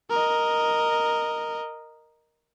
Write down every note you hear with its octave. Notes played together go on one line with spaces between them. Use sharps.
A#4 D#5